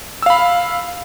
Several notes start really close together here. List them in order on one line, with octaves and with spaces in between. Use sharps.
E6 F5 B5